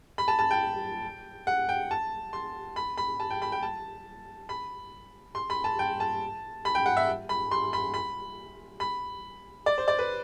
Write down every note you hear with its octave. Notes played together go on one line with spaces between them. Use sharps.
B5
A5
A5
G5
F#5
G5
A5
C6
B5
B5
A5
G5
B5
G5
A5
B5
C6
B5
A5
G5
A5
B5
G5
F#5
E5
B5
C6
B5
B5
B5
D5
C5
D5
B4